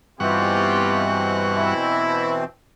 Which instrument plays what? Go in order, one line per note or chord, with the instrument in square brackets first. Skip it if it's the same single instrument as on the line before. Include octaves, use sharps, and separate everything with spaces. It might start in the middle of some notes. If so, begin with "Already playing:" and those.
[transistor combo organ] G2 F#5 C#6 [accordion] B2 E3 C4 [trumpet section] F4 G4
[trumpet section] E4